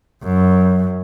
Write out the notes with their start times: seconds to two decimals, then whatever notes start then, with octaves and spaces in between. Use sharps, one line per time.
0.24 F#2